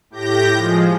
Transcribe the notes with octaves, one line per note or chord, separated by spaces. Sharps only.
A2 G4 G6 A#6
F3 G#3